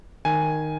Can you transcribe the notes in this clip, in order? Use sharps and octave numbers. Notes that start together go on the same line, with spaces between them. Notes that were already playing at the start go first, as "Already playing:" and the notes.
D#3 G#5